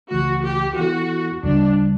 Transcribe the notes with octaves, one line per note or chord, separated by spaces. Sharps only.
C#2 C#3 E3 A3 F#4
G4
E3 B3 E4 F#4 A4
D2 C#3 G3 D4